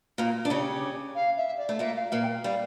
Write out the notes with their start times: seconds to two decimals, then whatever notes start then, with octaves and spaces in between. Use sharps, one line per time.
0.18 A#2 A#3 F4
0.45 D4
0.50 C#3 C#4 G4
1.15 F5
1.37 E5
1.58 D5
1.69 A3
1.79 A#2 A#3 E5
1.96 F5
2.12 A#2 A#3 F5
2.22 G5
2.28 F5
2.44 G3 F5